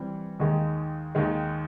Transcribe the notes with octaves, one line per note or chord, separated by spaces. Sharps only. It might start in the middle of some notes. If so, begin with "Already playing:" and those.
Already playing: E3 G3 C4
D#2 D#3 G#3
D#2 D#3 G#3